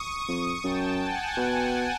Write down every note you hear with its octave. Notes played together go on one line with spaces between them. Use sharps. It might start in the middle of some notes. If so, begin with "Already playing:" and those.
Already playing: C#6 D#6
F2
F#2 G5 A5
F#5 G#5
B2 G5 A5